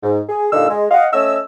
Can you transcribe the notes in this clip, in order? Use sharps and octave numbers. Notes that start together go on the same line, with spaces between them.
G#2
G#4
A#2 D3 G3 D#4 F5 E6
G#3
D#5 F5 F#5
A3 C#4 D#5 E6